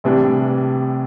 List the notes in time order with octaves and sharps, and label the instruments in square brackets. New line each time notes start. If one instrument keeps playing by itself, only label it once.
[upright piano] A#1 A2 E3 G3 D4 [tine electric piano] C3